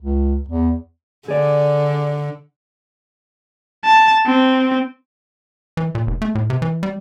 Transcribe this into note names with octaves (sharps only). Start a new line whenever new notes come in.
C#2
E2
D3 G#4 D5
A5
C4
E3
A#2
F1
A3
A2
C3
E3
G3